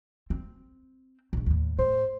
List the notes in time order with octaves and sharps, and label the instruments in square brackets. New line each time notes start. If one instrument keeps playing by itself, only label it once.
[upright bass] C4
A#1 G#2
D#2 A2
[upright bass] A2 [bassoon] C5